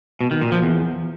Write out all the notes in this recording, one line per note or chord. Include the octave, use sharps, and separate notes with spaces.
B2
D#3
A#2
F3
E2